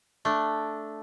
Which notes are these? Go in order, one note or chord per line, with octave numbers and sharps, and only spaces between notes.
A3 D4